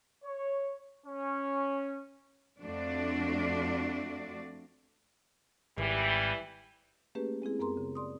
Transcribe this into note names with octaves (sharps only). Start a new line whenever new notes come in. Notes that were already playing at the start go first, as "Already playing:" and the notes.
C#5
C#4
F2 A3 D4 F#4 D5
G#1 E3 G3
A3 A#3 C#4 G4 G#4 B4
G#3 C4 E4 G#4
F#2 B3 G#4 A#4 A#5 C6
C#3
D5 C6 D#6